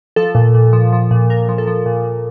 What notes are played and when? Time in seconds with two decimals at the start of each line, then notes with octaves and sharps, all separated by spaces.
0.16 F3 A4
0.35 A#2
0.55 A#2
0.73 F3
0.93 F3
1.11 A#2
1.30 A#2 A#4
1.49 F3
1.58 A4
1.67 F3
1.86 A#2
2.05 A#2